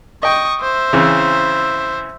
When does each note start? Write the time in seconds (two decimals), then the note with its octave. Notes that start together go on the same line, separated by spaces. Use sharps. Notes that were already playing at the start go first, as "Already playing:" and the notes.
0.23 D#5 G5 C#6 D#6
0.61 C5 E5
0.93 C#3 E3 C4